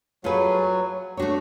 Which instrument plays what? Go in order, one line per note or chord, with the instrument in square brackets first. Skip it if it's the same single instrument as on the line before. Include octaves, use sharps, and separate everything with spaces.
[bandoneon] F#3 [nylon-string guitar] A3 F4 G#4 B4
[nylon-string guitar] A3 D4 F#4 C#5